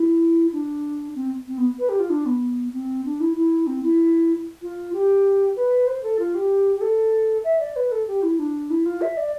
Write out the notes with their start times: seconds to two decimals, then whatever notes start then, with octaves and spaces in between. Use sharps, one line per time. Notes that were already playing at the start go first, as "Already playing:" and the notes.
Already playing: E4
0.52 D4
1.15 C4
1.47 C4
1.57 B3
1.78 B4
1.89 G4
1.99 F4
2.10 D4
2.26 B3
2.73 C4
3.05 D4
3.20 E4
3.36 E4
3.67 C4
3.83 E4
4.62 F4
4.93 G4
5.56 B4
5.87 C5
6.03 A4
6.19 F4
6.34 G4
6.76 G4
6.81 A4
7.44 E5
7.60 D5
7.76 B4
7.91 A4
8.07 G4
8.22 E4
8.39 D4
8.70 E4
8.85 F4
9.01 E5
9.17 D5